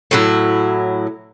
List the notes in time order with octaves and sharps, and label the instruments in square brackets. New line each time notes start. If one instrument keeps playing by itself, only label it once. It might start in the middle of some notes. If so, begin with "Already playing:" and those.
[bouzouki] A2 F#3 E4